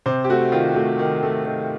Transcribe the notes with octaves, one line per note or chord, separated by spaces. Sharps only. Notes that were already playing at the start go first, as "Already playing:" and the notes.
C3 C5
G4
A3 F#4
D#3 F4
A3 F#4
D#3
A3
D#3